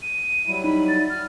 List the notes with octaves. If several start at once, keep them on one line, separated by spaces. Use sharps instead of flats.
D#7
F#3 G3 E4
D#4 B5
A6
F6